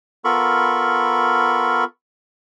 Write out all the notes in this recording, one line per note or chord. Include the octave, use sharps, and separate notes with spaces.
B3 F4 A4 A#4 B5 C#6